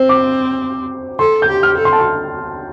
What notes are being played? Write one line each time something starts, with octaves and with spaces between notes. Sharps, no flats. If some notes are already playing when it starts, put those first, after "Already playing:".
Already playing: C4 C5
D6
A4 C6
G6
G4
F6
A4
C6
A5
C6